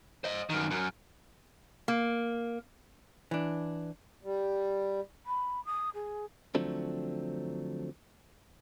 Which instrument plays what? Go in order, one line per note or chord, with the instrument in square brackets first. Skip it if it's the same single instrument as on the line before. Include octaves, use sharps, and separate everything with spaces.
[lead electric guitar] C5 D#5
F#2 D#3
F#2
[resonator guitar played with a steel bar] A#3
[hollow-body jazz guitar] E3 D4
[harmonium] G3
[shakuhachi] B5
D#6
G#4
[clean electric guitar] D3 F3 F#3 A3 C4 D4